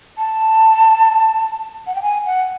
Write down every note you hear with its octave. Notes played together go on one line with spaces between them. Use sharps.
A5
F#5
G5
G#5
F#5